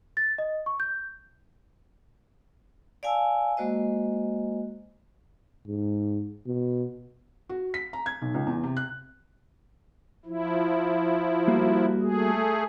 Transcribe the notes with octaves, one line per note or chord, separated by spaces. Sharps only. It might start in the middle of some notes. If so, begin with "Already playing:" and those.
A6
D#5
C#6
G6
D5 F5 G#5 A5 E6
G#3 A#3 F#4 C5 D#5
G#2
B2
F#4
B6
A#5
G#6
B1
C#2
E2
C3
F#6
F3 E4
G3 A#3 F#4
A3 G#4